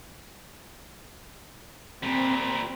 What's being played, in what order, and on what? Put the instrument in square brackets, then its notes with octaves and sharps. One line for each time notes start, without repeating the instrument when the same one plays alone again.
[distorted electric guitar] A#2 G3 [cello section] C4